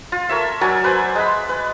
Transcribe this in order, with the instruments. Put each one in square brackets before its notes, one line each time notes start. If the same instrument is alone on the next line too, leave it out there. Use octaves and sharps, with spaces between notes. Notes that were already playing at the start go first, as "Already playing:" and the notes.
[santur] F4
A4 A#4 C#5 E5
F#3 A#4 D5 G#5
B4 C5 G#5
G#3 B5
B4